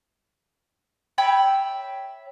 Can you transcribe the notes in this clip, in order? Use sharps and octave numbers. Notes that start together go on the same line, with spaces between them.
C#5 E5 G5 B5